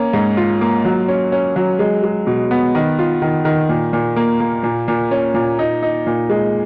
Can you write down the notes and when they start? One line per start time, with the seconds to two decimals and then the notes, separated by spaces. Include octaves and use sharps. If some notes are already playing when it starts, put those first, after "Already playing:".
Already playing: A#3 C#4
0.13 G#2
0.37 F4
0.61 A#3
0.85 F#3
1.08 C#4
1.32 C#4
1.56 F#3
1.79 G#3
2.03 G#3
2.27 B2
2.51 B3
2.75 D#3
2.99 F4
3.22 D#3
3.45 D#3
3.69 A#2
3.93 A#2
4.16 A#3
4.40 A#3
4.63 A#2
4.88 A#2
5.11 C#4
5.34 A#2
5.59 D#4
5.83 D#4
6.06 A#2
6.30 G#3